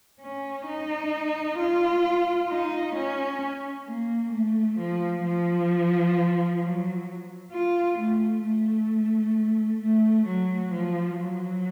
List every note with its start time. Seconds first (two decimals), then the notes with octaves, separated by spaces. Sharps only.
0.22 C#4
0.67 D#4
1.58 F4
2.49 D#4
2.96 C#4
3.87 A#3
4.32 A3
4.79 F3
5.24 F3
6.61 F#3
7.52 F4
7.98 A3
8.44 A3
9.81 A3
10.27 F#3
10.73 F3
11.18 F#3